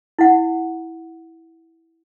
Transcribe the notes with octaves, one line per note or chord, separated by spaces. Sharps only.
E4 F#5